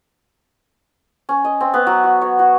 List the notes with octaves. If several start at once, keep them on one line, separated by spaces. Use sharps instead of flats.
C#4
D#5
C4
B3
F#3
F#4
C#5
F#4